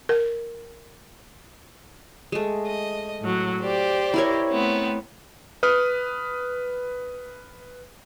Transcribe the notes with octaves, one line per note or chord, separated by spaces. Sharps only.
A#4
G#3 A3
D#5
A2 F#3
G4 C5 D5
E4 A#4 C#5
A3 B3 C4
B4 D#6 F6